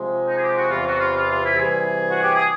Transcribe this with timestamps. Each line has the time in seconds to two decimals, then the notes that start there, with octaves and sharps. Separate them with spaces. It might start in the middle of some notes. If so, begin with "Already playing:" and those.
Already playing: C3 F3 G#3
0.26 D#4
0.36 G#4
0.41 G4
0.56 F#4
0.69 E2 C3 E3 F4
0.85 F#4
0.99 F4
1.14 F4
1.29 F4
1.44 E4
1.57 C3 E3 G3 G#4
2.09 F#4
2.22 G4
2.34 G#4